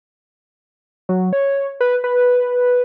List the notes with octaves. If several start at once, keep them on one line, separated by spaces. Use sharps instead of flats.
F#3
C#5
B4
B4